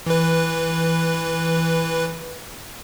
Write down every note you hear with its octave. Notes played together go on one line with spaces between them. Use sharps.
E3 B4